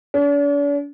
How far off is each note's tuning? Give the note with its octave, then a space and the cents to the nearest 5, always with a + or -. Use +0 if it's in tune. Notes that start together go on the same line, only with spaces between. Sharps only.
D4 -45